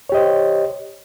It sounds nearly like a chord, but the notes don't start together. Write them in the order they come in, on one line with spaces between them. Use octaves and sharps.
C#5 G4 D#5 C5